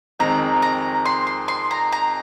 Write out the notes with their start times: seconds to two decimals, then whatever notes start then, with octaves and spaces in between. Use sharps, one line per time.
0.19 F2 D#3 G#3 C4 A#5
0.62 A#5
1.05 C6
1.27 C6
1.48 C6
1.71 A#5
1.92 A#5